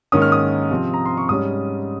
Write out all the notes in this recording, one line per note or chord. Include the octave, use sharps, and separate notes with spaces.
G#2 D#3 A#3 C#4 D#6
F6
D#6
C3 F3 C4
A#5
C6
C#6
G#2 G3 C#4 D#6